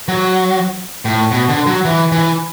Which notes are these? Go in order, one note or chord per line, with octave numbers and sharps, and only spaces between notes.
F#3
A2
B2
D3
F#3
E3
E3